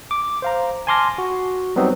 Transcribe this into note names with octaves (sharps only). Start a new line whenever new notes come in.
D6
C5 F5 A#5
G#5 A5 C6 D6 F6 A#6
F#4
F#3 G3 B3 C4 D#4